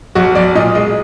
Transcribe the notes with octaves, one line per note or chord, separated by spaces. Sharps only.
B1 F#4
B1 D5
A#2 D#5
G#3 D#5